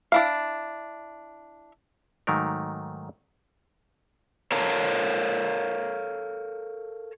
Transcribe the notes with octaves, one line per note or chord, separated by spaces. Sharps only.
D4 E4 F5
G#2 D#3 F#3 A3 A#4
A4 A#4 C#5 F5 A5 A#5